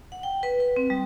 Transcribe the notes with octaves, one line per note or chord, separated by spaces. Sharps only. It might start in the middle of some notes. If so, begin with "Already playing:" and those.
F#5
G5
B4
B4
C4
G3